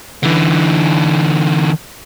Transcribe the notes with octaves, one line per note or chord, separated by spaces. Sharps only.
D3 E3